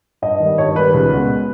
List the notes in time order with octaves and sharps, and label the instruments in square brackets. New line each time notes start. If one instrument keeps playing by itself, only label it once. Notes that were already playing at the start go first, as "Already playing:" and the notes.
[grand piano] G2 D#5
D#3 G3
G2 C#5
D#3 G3 B4
C#2
B2 G#3